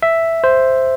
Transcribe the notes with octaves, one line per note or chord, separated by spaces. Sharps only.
E5
C5